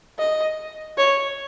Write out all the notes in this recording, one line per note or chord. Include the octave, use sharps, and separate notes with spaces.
D#5
C#5